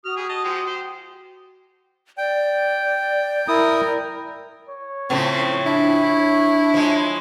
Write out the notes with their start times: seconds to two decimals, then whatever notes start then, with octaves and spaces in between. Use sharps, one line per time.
0.05 F#4 D#6 F6
0.17 G3 G#4 G#5
0.29 D#5 A5
0.44 F3 G#3 G4
0.66 G4 C5
2.18 D5 G5
3.48 E4 A#4 D#6
4.69 C#5
5.10 A2 C#3 F3 C4
5.66 D4 E4
6.74 F3 G#3